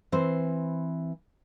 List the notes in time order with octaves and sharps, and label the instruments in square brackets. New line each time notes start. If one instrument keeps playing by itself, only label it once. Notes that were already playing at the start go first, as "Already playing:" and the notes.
[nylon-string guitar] E3 C4 C5